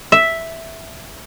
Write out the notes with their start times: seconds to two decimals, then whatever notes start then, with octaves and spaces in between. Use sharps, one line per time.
0.12 E5